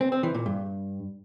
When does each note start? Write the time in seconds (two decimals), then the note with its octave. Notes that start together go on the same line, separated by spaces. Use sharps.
0.01 C4
0.12 C4
0.23 E3
0.34 A#2
0.46 G2